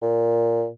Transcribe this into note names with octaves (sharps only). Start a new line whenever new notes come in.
A#2